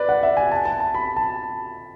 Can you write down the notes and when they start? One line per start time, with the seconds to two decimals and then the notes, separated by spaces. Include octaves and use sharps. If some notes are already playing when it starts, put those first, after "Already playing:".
Already playing: B4 D5
0.09 F#5
0.23 E5
0.37 G#5
0.52 A5
0.65 A5
0.80 A5
0.94 B5
1.17 A5